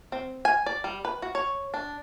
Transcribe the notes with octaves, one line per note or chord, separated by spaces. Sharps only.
C4
G#5
D5
G3
B4
F#4
C#5
D4